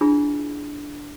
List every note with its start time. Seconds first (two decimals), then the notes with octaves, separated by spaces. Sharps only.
0.01 D4 E4 F4 G#4 B5